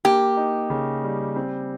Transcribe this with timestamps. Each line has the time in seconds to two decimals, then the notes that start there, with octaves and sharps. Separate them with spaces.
0.05 A#3 G4
0.37 D#4
0.70 C#3
1.04 G3
1.36 C4